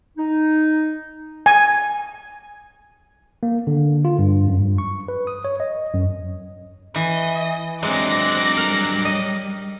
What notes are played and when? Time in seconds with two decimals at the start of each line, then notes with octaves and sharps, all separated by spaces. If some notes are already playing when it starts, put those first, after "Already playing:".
0.17 D#4
1.46 G#5
3.43 A#3
3.67 D3
4.05 F4
4.19 G2
4.48 F#2
4.60 G2
4.78 C#6
5.08 B4
5.27 D#6
5.45 C#5
5.60 D#5
5.94 F#2
6.96 E3 D#5
7.83 F#3 G#3 C4 D4 D6 F#6 A#6
8.57 G3 A#4
9.05 D#5